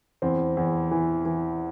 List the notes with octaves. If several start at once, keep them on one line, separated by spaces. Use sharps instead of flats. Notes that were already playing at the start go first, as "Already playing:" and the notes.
E2 C4
E2
E3
E3